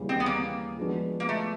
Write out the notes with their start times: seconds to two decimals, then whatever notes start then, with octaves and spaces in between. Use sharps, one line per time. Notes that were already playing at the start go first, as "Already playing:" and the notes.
Already playing: D#2 C#3 E3 G3
0.09 C4
0.20 B3
0.26 A#3
0.77 F3 G#3 B3 D4 F#4
1.20 A#3
1.29 A3